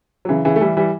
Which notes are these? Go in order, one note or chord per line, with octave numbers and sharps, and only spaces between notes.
F#3
C#3 E3
C#3 E3
A3
E3 G3
E3 G3